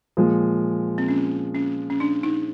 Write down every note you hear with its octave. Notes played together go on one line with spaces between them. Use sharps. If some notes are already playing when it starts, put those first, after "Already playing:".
A#2 F3 G#3
C4
C#4
C#4
C#4
D4
D#4